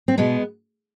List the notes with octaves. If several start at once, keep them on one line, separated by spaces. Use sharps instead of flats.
C4
B2 G#3 B3